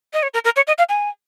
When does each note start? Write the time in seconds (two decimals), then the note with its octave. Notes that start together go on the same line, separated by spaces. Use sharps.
0.14 D#5
0.23 C#5
0.34 A#4
0.45 A#4
0.56 C#5
0.67 D#5
0.78 F5
0.89 G#5